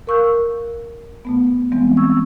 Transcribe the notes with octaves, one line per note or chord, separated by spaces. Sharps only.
A#4 F5 C#6 E6 F#6 G6
B2 A3 B3
E3 G3 G#3 B3 C4
C#6 E6 G#6